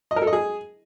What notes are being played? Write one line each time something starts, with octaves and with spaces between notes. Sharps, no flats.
D#5
A#4
A4
D#5
G#4